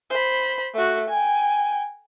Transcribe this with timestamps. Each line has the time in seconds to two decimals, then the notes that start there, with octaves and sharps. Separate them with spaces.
0.10 C5 B5
0.74 A3 F#4
1.10 G5 G#5